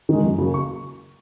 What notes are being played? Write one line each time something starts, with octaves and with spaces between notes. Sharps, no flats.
D#3 G#3
F#2
C#3 F#3 A#3
C#6